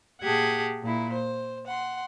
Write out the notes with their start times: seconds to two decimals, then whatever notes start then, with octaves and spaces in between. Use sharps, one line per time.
0.22 A#2 G4 G#4 F#5 A5 G#6
0.83 A#2 E4
1.13 C5
1.67 F#5 C6